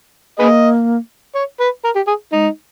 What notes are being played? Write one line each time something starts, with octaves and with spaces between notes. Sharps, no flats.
A#3 G#4 B4 D#5
C#5
B4
A#4
G4
G#4
G#3 D#4